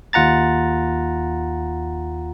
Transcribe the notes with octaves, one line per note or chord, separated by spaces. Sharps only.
D#2 F4 F#5 A#5 A6